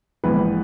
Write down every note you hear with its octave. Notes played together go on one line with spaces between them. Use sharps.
A#1 G#2 E3 B3 B4